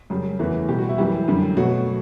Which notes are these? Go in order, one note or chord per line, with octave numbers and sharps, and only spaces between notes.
F#2 C#3 G3
E2 C#3 E3 A3
B2 G3 G4
F#4
E4
F#2 E3 G3 G4
F#2 D3 G3
B2 F#3 A3 F#4